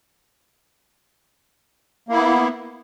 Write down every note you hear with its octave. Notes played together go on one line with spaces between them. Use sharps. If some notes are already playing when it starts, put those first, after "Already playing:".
A#3 B3 E4